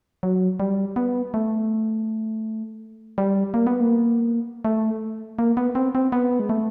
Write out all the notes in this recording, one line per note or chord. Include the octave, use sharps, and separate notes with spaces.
F#3
G3
B3
A3
G3
A#3
B3
A#3
A3
A#3
B3
C4
C4
B3
G#3
A3